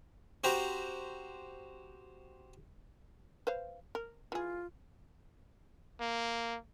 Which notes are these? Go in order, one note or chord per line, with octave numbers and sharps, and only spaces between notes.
C4 F#4 G4 C5 G5 A#5
B4 C5 F5
A#4
E3 F4 G#4
A#3